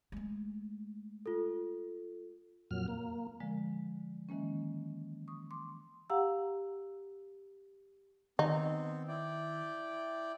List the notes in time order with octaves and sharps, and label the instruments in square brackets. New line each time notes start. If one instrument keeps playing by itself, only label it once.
[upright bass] G#3 A3
[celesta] F4 A4
[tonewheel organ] F2 A#2 F#3 F6
A#3
[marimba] D3 F3 G#3
D#3 E3 G#3 A#3 C#4
C#6 D#6
C6 D6
G4 F5 F#5 A#5 E6
[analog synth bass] D#3 [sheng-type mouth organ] B3 C4 [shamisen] D#4
[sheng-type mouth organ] E4 D5 G5